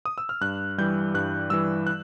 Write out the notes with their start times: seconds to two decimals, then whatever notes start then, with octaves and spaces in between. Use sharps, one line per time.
0.05 D#6
0.18 E6
0.29 F6
0.41 G2 F#6
0.78 E3 G3 G6
1.14 G2 F#6
1.50 E3 G3 E6
1.87 F#6